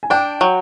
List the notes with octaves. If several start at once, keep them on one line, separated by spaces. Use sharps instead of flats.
G#5
D4 G5
F#3